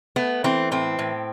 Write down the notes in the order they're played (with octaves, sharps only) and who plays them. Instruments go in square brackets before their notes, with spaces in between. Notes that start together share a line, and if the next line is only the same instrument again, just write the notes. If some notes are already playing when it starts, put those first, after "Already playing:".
[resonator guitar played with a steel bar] A3 B3
E3 C4
A2 C4
A2